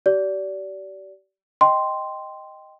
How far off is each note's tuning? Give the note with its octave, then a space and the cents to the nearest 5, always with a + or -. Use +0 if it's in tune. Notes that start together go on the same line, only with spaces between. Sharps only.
G4 -40 D5 -25
D#5 +0 G5 +0 C6 -5